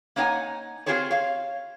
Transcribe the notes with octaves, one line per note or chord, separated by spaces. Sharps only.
A#3 D4 D#4 C#5 F#5 G#5
C4 F4 G4 G#4 C5 C#5
C#5 F5